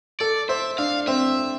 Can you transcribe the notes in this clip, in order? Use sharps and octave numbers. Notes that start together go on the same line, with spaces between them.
A4 D5
C5 E5
D4 F5
C4 E5